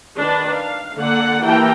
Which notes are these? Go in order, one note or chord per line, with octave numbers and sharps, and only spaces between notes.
D#3 D4 B4
F5
D3 A#3 D5 F#5
E3 A#3 G4 A#4 G5 A5